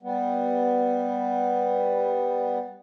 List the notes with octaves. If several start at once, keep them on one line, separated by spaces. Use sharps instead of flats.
G3 B3